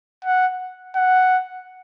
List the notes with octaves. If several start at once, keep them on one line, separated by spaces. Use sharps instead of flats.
F#5
F#5